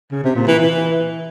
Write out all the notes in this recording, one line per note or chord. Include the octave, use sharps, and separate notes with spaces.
C#3
C3
A#2
E3
E3